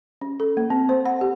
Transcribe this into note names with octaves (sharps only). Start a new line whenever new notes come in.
C#4
A4
A#3
C4
C5
F#5
G4